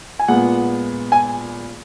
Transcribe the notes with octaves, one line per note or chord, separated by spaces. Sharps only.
G#5
A#2 G#3 B3 F#5
G#5